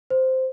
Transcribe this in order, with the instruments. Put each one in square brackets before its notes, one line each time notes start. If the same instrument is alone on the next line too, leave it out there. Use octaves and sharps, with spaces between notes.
[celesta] C5